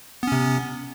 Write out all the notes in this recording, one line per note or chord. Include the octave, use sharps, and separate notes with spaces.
C3 B3 C#4